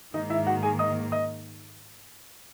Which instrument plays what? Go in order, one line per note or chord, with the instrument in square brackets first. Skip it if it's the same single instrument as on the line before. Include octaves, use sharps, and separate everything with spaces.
[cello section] G#2 D#3 A#3 [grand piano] D#4 D#5
[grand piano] E4 E5
F#4 F#5
G#4 G#5
D#5 D#6
D#5 D#6